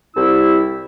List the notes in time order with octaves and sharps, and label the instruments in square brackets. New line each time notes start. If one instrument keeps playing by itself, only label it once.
[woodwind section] C2 E4 E6